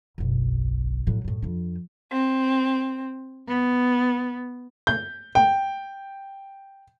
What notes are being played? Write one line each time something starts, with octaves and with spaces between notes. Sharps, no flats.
F#1 B1
A2 F#3
F#2 A2
F2 D4
C4
B3
G6
G5